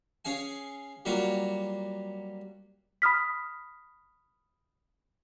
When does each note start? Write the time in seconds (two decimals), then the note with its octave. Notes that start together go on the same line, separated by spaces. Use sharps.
0.25 C#4 G#4 F5 G#5
1.05 F#3 G3 A#3 F4 F#4
3.02 B5 D#6 F6 B6